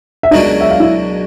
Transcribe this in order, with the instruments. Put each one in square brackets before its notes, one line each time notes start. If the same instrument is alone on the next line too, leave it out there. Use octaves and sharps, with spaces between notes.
[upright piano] E5
[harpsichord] C#2 B2 F#3 A#3 D4 [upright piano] D#4 D#5
[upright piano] E5
F5
E4 E5